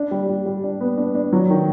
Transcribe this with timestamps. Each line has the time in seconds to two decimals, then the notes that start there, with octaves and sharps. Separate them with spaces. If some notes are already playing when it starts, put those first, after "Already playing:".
Already playing: D4
0.11 G3
0.29 G3
0.46 G3
0.63 D4
0.81 B3
0.97 D4
1.15 D4
1.33 F#3
1.50 D#3